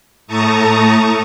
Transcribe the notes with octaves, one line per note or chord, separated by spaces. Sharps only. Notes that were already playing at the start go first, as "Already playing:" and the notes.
A2 A3 A5 A#5 C#6 D#6